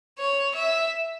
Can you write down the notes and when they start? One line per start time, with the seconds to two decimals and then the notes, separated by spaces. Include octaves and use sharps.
0.19 C#5
0.54 E5